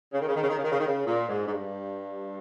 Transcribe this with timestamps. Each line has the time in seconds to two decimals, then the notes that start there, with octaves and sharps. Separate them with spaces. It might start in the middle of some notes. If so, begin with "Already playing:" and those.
0.13 C#3
0.20 D#3
0.28 C#3
0.35 D#3
0.42 C#3
0.49 D#3
0.57 C#3
0.64 D#3
0.71 C#3
0.79 D#3
0.87 C#3
1.05 A#2
1.29 G#2
1.47 G#2
1.52 G2